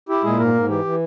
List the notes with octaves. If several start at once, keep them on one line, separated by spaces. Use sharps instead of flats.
E4 G4
A#2 G#3 G#4
G#2 A#3 A#4
G#2
E3 G4
E3